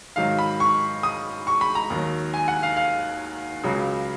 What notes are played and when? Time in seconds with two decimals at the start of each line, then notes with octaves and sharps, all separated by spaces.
0.16 G#2 D#3 F#3 F5
0.39 B5
0.60 C#6
1.03 D#6
1.47 C#6
1.61 B5
1.75 A#5
1.90 D#2 D#3 F#3
2.34 G#5
2.48 F#5
2.63 F5
2.77 F5
3.63 C#2 C#3 F#3